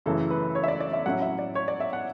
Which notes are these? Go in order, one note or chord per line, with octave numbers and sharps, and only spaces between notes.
F#2 C#3 E3 A3 A4
B4
C#5
E5
D5
D5
E5
A2 F#3 C#4 E4 F#5
E5
D5
C#5
D5
E5
F#5